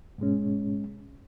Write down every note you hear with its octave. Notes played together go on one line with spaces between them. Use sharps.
G#2 B2 G#3 C#4